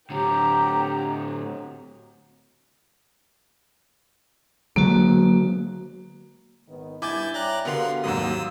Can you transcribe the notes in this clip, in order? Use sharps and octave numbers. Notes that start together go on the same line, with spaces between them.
A2 D3 G4 G5 A#5
D3 F#3 G#3 A#3 F#4
G#1 D#3 B3
G2 E4 G#5 D6 G6 A6
C#5 D5 E5 G5 A#5 F#6
D3 B3 F#4 G4 A#4 F5 C6 F7
D#2 G#2 F#3 D#6 E6